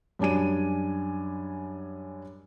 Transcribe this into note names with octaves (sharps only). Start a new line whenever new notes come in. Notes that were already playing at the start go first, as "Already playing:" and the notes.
F#2 G3 D4 G#5 D#7